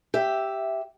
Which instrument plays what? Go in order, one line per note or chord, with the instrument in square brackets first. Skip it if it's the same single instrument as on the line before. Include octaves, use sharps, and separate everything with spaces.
[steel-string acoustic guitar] G4 E5